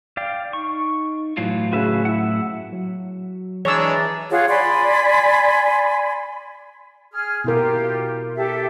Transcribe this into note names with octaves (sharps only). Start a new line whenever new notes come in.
D5 F5 G5
D#4 C#6
A2 E3 F#3 F4
C#3 F#4 B4 E5
E4 E5 F#5
F#3
E3 G#3 D4 G#4 C#5 A#5 E6
F4 G#4 C#5 F#5
D5 G#5 B5 C6
G#4 F6
B2 E4 F4 G4 A#4
G4 A4 E5